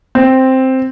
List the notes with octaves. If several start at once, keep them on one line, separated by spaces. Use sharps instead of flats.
C4